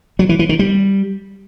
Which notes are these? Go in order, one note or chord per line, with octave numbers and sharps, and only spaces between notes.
F#3
E3
E3
D#3
G3